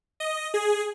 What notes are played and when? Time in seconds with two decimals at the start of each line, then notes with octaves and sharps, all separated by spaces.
0.20 D#5
0.54 G#4